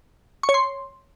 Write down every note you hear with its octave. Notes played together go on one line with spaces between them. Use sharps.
C#6
C#5
C6